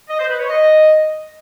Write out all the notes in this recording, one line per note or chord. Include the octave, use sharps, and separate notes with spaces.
D#5
C5
B4
C#5
D#5